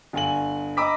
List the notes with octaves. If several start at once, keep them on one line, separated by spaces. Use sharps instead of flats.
G1 F5 G#5 F#7
D#5 A#5 B5 D6 E6 B6